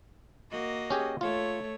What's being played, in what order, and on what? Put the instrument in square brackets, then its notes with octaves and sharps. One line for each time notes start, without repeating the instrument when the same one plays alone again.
[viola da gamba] A#3 F#4 D#5
[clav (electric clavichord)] C#4 G4 G#4
[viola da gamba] A3 C#5 [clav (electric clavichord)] F4